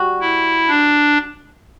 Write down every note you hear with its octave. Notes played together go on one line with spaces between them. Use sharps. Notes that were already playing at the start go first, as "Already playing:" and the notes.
Already playing: G3 F#4
E4
D4